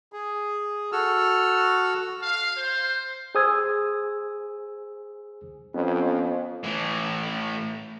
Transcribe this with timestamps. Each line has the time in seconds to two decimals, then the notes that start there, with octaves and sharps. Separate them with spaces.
0.13 G#4
0.92 F#4 A4 E6 F6
2.23 F5
2.57 C5
3.35 G#4 C5 G#5 D#6 E6 G#6
5.74 F2 B3 C#4
6.64 A2 E3